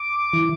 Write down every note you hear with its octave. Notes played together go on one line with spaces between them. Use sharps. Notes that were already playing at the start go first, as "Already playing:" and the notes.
Already playing: D6
E3